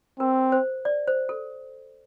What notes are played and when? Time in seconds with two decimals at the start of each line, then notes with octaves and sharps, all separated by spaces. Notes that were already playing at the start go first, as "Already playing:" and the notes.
0.19 C4 A#4
0.52 C5
0.85 D5
1.07 C5
1.29 A4